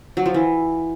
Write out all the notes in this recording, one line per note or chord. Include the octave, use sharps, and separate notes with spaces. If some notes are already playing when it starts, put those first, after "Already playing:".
F#3
F3
E3